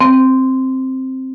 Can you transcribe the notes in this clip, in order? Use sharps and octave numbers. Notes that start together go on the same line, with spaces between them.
C4